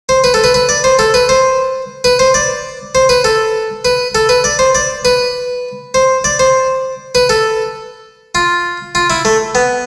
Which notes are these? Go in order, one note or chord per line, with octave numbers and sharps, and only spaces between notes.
C5
B4
A4
B4
B4
D5
C5
A4
B4
C5
B4
C5
D5
C5
B4
A4
B4
A4
B4
D5
C5
D5
B4
C5
D5
C5
B4
A4
F4
F4
E4
A3
B3